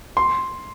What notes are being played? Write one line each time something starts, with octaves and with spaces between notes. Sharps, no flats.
C6